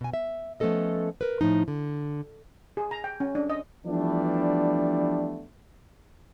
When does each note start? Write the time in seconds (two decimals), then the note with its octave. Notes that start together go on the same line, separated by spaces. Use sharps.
0.01 B2 G#5
0.14 E5
0.60 F3 A3 B3 C#4 A4 D#5
1.21 A#4 B4
1.41 A2 F3 D#4
1.68 D3
2.77 G#4
2.91 A#5
3.04 G5
3.20 C#4
3.35 D4
3.50 D#5
3.86 E3 F3 G3 A3 B3 D4